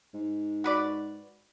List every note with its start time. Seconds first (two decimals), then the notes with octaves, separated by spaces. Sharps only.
0.14 G#2
0.64 F#4 B4 D5